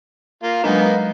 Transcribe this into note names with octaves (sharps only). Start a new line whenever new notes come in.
A#3 F4
F#3 G#3 A#3 B3 D4 D#4